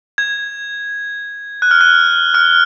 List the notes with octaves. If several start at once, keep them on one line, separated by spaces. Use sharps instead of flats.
G#6
F#6
F6
F#6
F6